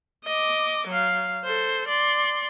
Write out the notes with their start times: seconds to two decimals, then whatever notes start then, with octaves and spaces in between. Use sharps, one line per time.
0.25 D#5 D6
0.88 F#3 F5
1.44 A4 C5
1.88 D5 C6